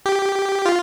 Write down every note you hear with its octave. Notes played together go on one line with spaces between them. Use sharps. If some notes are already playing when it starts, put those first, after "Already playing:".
G4
F4